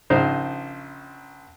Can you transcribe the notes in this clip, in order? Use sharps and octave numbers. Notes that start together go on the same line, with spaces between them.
A#1 C#3 D#4 C5